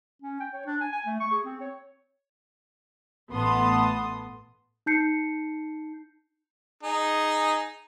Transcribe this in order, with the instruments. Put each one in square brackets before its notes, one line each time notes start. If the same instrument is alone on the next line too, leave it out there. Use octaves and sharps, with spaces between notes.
[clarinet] C#4
G5
C#5
D4
G#5
G#5
A3
C#6
G#4
C4
C#5
[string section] A1 A3 B3 A5 C6 D#6
[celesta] D#4 A5 G6 C7 C#7
[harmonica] D#4 G#4